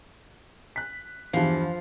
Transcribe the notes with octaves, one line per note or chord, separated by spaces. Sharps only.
F#6 B6
E2 G2 E3 F3